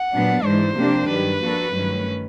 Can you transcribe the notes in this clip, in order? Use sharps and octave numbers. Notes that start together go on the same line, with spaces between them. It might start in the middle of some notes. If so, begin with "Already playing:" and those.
Already playing: F#5
A#2 F#3 B3 D4
G#2 E3 G#3 C5
C3 F3 A#3 D4 G4
G2 D#3 F#3 B4
F3 A#3 D4 F#4 A4
G2 D#3 F#3 A3 C#4